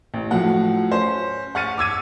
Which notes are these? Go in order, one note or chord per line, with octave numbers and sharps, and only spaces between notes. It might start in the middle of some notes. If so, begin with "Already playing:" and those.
A1
A2 F3 F#3 F#5
C#4 C5
F#5 C#6 F6 A6 C#7 D#7
D6 E6 G#6 D#7